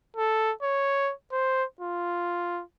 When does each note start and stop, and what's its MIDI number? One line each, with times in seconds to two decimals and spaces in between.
0.17 0.52 69
0.62 1.12 73
1.32 1.64 72
1.80 2.62 65